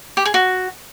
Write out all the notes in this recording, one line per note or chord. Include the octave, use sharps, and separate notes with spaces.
G4
G#4
F#4